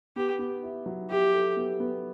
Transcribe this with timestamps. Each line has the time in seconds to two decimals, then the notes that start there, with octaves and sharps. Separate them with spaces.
0.16 B3 G4
0.39 B3
0.63 E4
0.86 F#3
1.09 E4 G4
1.33 A4
1.57 B3
1.80 B3